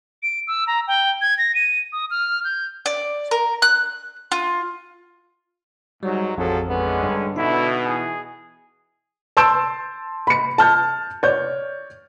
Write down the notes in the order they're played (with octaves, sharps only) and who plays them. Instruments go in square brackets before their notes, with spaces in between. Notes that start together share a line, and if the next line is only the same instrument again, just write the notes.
[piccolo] D7
E6
A#5
G5
G#6
A#6
D#7
D#6
F6
G6
[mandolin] D5
A#4
F#6
F4
[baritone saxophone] G#2 [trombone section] F#3 [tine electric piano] G3
[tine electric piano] A1 F2 [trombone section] F3 G#4 A4 [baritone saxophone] F#3
[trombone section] D3 G#3 [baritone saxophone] B3 [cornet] C#4
[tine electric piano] G2
[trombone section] B2 [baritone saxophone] D3 [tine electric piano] D#4 [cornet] E4
[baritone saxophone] E3 [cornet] G#4
[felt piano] A5 C6 E6 G6 D7 E7
B5 C#7
A5 F6 G6
C#5 D5 G6